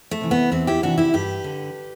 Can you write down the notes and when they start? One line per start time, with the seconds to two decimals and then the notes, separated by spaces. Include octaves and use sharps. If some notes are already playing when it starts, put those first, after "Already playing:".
0.11 A3
0.21 C3 E3
0.31 B3
0.52 E2 C4 E4
0.67 E4 G4
0.83 C3 E3 D4 F#4
0.98 E4 G4
1.13 G2 G4 B4
1.44 D3